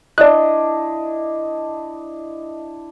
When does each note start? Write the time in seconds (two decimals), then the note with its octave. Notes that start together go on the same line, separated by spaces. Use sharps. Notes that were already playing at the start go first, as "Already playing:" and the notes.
0.18 D4 E4 D5 D#5 F#6